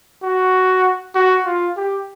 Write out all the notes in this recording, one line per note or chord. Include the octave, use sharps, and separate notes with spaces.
F#4
F#4
F4
G4